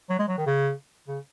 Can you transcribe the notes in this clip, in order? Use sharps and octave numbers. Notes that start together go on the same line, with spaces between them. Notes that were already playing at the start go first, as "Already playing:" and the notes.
F#3
G#3
F#3
D#3
C#3
C#3